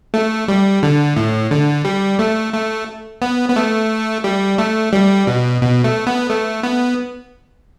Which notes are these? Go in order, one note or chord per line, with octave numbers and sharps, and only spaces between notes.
A3
G3
D3
A2
D3
G3
A3
A3
B3
B3
A3
G3
A3
G3
B2
B2
A3
B3
A3
B3